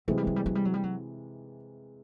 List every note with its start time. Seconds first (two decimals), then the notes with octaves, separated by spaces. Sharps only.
0.08 C3 E3 F#3 G#3
0.17 G3
0.27 F#3
0.36 G3
0.46 F#3
0.55 G3
0.65 F#3
0.74 G3
0.83 F#3